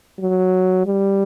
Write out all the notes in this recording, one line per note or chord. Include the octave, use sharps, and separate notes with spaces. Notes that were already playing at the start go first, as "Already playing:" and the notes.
F#3
G3